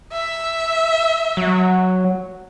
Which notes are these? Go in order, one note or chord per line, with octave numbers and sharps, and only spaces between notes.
E5
F#3